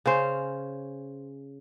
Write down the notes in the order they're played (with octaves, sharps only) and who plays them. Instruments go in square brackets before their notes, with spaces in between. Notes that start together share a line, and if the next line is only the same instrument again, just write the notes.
[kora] C#3 C#4 C5